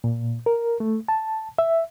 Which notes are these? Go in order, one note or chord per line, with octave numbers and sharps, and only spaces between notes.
A#2
A#4
A3
A5
E5